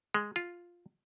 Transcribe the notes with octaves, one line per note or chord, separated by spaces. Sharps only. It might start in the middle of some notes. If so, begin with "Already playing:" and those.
G#3
F4